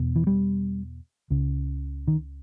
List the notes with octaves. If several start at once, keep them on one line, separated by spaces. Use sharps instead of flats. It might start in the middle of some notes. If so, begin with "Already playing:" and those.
Already playing: E2 B2
E3
G3
C#2 C#3
D#3